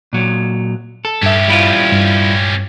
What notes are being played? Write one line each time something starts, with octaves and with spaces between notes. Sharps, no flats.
A#2 F#3
A4
G2 C#4 G4 E5
G3 E4 F4
G2